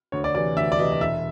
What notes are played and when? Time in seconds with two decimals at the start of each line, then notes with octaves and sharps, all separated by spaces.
0.12 D2 C#5
0.24 D5
0.35 C3 E3 D5
0.56 D2 E5
0.72 D5
0.79 C3 E3 D#5
0.92 D#5
1.01 E1 E5